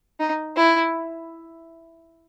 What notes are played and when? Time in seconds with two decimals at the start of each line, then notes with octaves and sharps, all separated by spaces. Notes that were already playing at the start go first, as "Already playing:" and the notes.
0.20 D#4
0.56 E4